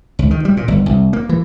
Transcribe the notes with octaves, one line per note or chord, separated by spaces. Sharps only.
C#2
D#3
G3
A#2
G1
C2
A#3
E3